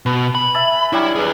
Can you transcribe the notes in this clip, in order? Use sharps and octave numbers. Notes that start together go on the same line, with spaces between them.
B2 B4
B5
E5 G#5 A5
F#3 G3 D4 E4
G#4 B4